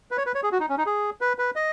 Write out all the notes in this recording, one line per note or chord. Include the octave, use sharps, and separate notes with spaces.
B4
C#5
B4
C#5
G#4
F#4
D#4
C#4
D#4
G#4
B4
B4
D#5